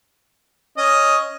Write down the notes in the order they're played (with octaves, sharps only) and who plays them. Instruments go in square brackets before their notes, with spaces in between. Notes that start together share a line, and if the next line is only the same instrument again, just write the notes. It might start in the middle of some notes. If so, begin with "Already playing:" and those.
[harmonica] C#4 D#5